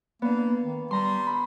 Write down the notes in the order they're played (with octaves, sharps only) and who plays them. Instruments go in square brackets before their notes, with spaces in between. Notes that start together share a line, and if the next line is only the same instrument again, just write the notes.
[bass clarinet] A#3 [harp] B3 D4
[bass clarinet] D#3
[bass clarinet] G3 [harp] A#5 C6
[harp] B5